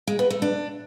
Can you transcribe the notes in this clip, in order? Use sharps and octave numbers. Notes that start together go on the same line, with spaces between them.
G#3
B3
A3
D4